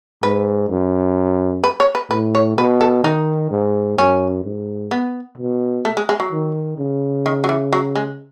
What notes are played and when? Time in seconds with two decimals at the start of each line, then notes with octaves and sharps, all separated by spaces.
0.23 G#2 B4
0.70 F#2
1.64 B4
1.80 C#5
1.95 B4
2.10 A2 B4
2.35 C#5
2.57 B2 B4
2.81 A4
3.04 D#3 D#4
3.51 G#2
3.98 F#2 C#4
4.45 G#2
4.91 B3
5.38 B2
5.85 A3
5.97 G#3
6.09 G#3
6.20 F#3
6.32 D#3
6.78 C#3
7.26 D#3
7.44 F#3
7.49 E3
7.73 F#3
7.95 G#3